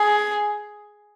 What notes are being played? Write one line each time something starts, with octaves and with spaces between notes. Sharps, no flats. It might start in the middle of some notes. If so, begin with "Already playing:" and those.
Already playing: G#4